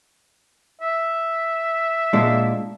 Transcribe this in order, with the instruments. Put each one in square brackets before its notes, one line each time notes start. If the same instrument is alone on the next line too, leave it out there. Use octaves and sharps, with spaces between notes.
[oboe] E5
[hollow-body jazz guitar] A#2 G#3 D4